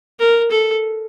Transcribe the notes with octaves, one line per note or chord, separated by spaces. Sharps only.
A#4
A4